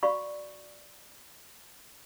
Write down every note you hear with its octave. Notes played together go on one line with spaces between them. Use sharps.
F#4 D5 F5 B5 C#6